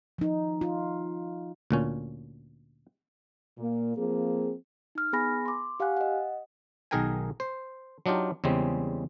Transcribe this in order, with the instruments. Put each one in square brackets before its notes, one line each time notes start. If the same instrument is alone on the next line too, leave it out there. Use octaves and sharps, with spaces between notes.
[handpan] F3 D#4
F4
[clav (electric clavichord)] D2 A#2 C#4
[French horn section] A#2 A#3
F3 A#3 C4 G#4
[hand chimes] D#4 F6
B3 G#4 G#5 B5 A#6
C6 D6
G4 F5 F#5 G#5 F#6
D#5 F#5
[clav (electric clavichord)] B1 D#3 G#4 A#4 G5 G#5
C5
F#3 D4 D#4 F4 G4
E2 C#3 G3 G#3 C4